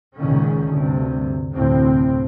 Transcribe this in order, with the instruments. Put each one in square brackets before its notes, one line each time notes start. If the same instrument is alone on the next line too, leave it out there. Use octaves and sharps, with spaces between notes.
[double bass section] C#2 A#2 D#3 C#4
D2 G2 C3
F1 D2 A2 C4